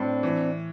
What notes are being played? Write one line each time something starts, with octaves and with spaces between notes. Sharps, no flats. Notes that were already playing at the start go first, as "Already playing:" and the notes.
Already playing: A2 C4 D4
E3